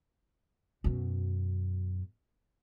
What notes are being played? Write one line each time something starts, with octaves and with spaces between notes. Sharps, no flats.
F#2 B2